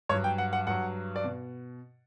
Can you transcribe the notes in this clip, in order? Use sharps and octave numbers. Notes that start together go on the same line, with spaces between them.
G2 F#3 C#5
G5
F#5
F#5
G2 F#3 F#5
D5
B2